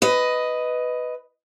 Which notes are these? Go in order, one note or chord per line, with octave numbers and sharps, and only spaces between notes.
B4 D#5